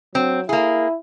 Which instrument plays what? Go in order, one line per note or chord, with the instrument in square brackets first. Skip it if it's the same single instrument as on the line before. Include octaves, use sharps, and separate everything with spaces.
[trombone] F#3 [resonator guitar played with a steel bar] C4
[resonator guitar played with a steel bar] A#3 G#4 [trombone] E4